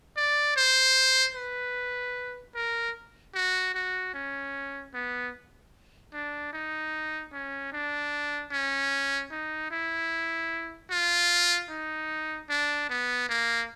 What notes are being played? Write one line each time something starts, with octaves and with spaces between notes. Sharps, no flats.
D5
C5
B4
A#4
F#4
F#4
C#4
B3
D4
D#4
C#4
D4
C#4
D#4
E4
F4
D#4
D4
B3
A#3